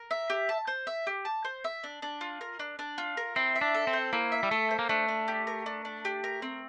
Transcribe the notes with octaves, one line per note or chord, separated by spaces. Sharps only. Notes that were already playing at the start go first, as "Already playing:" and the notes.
Already playing: A#4
E5
G4
A5
C5
E5
G4
A5
C5
E5
D4
D4
F4
A#4
D4
D4
F4
A#4
C4 E4
E5
D4
A4
C4
C5
A#3 E4
E5
G3
A3 A4
C5
A#3
A3 D4
D4
G4
A#4
D4
D4
G4
A#4
C4